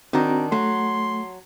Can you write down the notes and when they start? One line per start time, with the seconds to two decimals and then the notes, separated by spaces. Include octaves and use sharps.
0.13 D#3 C4 D4 F#4 A#5
0.52 F#3 A3 C6